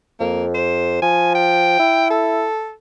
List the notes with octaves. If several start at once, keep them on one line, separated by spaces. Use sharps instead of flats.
F2 A#3
C5
F3 G#5
G5
E4
A4